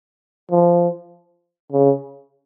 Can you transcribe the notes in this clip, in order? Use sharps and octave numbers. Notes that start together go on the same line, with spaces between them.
F3
C#3